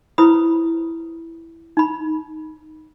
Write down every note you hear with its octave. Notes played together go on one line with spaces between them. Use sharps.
E4 B4 C5 B5 D#6
D#4 B5